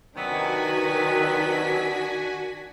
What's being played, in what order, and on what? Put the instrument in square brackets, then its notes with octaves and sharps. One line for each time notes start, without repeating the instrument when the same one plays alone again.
[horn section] C3 F#3 B3 [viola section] D#3 [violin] D4 B6 [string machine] F#4 G#5